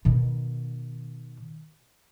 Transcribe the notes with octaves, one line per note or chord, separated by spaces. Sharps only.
B2 D#3